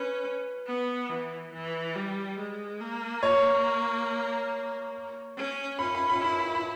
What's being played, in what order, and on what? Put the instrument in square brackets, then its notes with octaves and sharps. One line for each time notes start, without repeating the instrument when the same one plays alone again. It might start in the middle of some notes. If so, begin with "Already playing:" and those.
Already playing: [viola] C#4 [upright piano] B4
[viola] B3
E3
E3
G3
G#3
A#3
[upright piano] C#5
[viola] C#4
[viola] C#4 [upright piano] B5
[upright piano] B5
B5
[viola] E4 [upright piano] B5
[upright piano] B5
B5